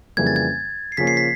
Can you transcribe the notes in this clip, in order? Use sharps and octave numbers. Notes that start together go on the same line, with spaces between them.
F2 C#3 E3 G3 A#3 G#6
A6
G#6
C7
C#3 F3 A#3 C#4 B6
C7
B6